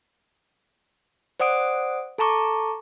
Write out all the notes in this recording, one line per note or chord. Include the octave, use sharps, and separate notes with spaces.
C5 D5 F#5 D#6 D7
A4 A5 A#5 C#6 D6